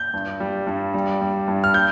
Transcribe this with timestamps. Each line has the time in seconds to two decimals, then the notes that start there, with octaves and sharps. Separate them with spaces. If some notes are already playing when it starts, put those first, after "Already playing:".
Already playing: G6
0.14 G2
0.40 G3
0.67 G2
0.94 G3
1.21 G3
1.48 G2
1.64 F6
1.74 G6